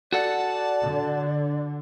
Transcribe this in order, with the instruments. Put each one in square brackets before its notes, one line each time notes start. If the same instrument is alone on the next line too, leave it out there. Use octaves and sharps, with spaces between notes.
[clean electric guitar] F#4 A4 F#5 [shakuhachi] D5 [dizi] A5
[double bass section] D3